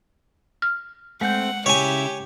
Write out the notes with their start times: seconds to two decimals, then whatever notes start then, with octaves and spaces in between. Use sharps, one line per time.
0.62 F6
1.21 G#3 A3 C4 F#5 G6
1.66 C#3 E4 G4 C#5 G#5